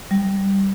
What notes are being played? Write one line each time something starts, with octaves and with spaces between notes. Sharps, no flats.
G3